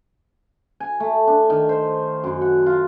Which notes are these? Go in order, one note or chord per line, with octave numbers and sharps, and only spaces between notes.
G#5
A3
D4
D#3
C5
F#2
F#5
F4